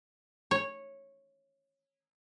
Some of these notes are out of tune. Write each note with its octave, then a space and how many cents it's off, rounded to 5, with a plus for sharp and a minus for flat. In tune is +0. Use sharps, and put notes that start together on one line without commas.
C#5 -10